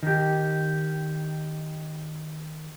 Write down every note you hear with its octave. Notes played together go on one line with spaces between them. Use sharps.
D#3 G4